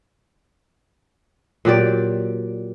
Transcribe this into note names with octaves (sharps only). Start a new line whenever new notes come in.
A#2 F#3 G4 D5